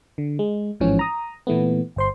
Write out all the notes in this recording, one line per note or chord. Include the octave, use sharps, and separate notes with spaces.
D3
G#3
A1 G#2 E3 F3 C#4
A#5 D#6
A#2 E3 A3 B3
G1 C5 C6